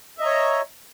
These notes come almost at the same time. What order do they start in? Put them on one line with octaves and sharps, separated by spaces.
E5 D#5 A#5 C#5